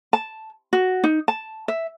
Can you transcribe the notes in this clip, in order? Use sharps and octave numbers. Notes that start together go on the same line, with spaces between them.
A5
F#4
D#4
A5
E5